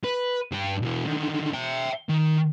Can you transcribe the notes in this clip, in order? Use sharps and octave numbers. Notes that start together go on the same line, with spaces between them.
B4
G2 G5
B2 E3
D3 D#3
E5 G5
D#3